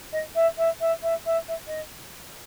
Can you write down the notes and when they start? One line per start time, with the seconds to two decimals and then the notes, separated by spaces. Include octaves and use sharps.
0.12 D#5
0.35 E5
0.57 E5
0.80 E5
1.02 E5
1.25 E5
1.48 E5
1.67 D#5